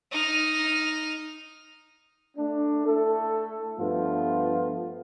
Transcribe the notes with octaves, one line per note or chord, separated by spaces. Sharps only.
D#4 F6
A3 D4
A3 E4 A4
G2 F3 A3 B3 F4